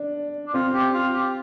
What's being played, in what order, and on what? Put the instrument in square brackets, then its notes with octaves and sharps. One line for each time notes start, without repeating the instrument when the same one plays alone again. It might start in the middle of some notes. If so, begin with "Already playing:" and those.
Already playing: [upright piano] D4
[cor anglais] D4
[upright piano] C4 [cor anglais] F4
[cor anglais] G4
F4
G4